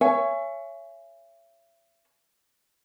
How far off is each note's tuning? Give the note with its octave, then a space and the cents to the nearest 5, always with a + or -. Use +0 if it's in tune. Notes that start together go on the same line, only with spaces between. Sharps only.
C#5 +0 E5 +35 G#5 +0